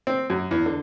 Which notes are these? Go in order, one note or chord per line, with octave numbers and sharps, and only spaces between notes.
C4
F#2
E2
D3